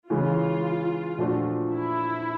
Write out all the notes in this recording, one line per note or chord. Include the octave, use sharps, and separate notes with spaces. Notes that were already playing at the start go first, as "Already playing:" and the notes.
C#3 E3 G#3 F4
A#2 F3 A3 D4 F#4
E4